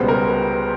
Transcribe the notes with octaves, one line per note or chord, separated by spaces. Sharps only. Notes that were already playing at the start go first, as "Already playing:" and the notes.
Already playing: C#2 B2 G3 B3 C5
A#4